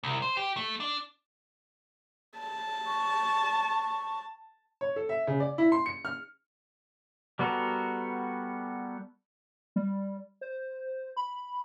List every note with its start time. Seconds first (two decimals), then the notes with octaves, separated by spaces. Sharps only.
0.04 C2
0.22 C5
0.37 G4
0.57 A3
0.80 D4
2.39 A5
2.87 C#6
4.81 C#5
4.96 A4
5.09 E5
5.27 C#3
5.40 D5
5.58 E4
5.72 C6
5.86 C#7
6.05 F6
7.39 G3 B3 F#4 A4 A#4
9.76 G3
10.41 C5
11.16 B5